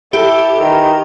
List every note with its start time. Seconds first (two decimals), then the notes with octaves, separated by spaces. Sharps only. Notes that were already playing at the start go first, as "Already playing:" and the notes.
0.13 E4 G4 A4
0.61 D#3 E3